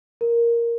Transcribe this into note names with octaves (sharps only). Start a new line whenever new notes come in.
A#4